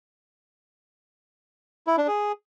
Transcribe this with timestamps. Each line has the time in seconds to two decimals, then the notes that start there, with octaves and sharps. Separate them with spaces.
1.87 E4
1.98 D4
2.08 G#4